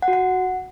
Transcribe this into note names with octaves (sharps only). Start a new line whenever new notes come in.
F#5
F#4
F#5